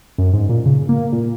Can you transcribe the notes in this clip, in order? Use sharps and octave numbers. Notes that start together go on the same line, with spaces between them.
F#2
G#2
A#2
C#3
A#3
A#2